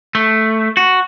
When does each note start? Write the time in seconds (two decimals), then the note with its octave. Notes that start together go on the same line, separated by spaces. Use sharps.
0.15 A3
0.77 F#4